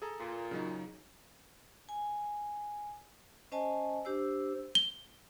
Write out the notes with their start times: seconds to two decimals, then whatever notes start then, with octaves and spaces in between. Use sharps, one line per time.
0.02 G#4 A4 A#5
0.20 A#2
0.51 C#3 F#3 D#4
1.89 G#5
3.52 C#4 C5 D#5 G#5 A5
4.05 D4 G4 C5 E6
4.75 G7